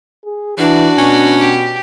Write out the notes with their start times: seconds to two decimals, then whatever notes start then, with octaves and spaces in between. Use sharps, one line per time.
0.25 G#4
0.58 E3 D4 F#4 D5
0.98 B2 C#4
1.40 G4